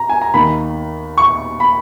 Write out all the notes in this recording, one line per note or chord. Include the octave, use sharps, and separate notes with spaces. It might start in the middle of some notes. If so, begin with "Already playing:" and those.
Already playing: A#5
G#5
A#5
D#2 D#3 B5
C#6
B5